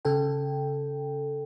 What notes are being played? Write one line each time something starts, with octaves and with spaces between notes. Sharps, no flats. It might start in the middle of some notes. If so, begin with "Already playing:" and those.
C#3 A4 G5